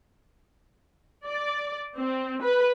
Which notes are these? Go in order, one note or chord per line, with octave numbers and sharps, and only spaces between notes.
D5
C4
B4